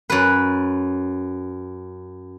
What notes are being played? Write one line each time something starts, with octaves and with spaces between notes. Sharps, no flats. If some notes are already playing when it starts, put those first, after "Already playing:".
F#2 B4